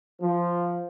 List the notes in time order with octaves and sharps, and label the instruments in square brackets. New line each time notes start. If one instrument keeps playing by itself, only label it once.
[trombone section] F3